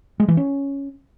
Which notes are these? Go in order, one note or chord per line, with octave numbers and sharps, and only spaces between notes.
G#3
E3
C#4